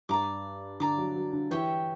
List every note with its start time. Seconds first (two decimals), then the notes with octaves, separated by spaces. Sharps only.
0.09 G2 D5 A#5 D6
0.80 D3 D5 A#5 D6
0.98 F#3
1.16 F#3
1.33 D3
1.51 E3 G4 C#5 E5 G5